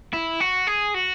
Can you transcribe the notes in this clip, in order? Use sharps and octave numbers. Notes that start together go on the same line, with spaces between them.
E4
F#4
G#4
F#4